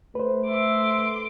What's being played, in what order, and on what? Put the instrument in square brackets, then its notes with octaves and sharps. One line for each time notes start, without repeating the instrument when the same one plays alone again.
[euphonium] A3 [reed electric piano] B4 C5
[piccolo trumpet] E5 [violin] C6 D6